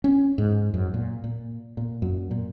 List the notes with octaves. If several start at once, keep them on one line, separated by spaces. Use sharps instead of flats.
C#4
G#2
F#2
A#2
A#2
A#2
F#2
A#2